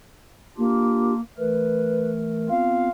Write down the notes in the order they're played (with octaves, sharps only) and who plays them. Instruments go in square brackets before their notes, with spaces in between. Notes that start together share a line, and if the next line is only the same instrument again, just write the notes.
[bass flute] A#3 [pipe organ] D4 F4 G4
[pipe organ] E3 A3 A#4 [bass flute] B4
[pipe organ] B3 C4 F4 [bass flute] F5